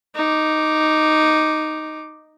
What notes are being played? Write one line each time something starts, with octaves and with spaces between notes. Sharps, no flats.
D#4 D6